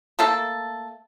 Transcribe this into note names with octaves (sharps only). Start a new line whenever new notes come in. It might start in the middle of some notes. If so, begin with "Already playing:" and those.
A3 A#3 A4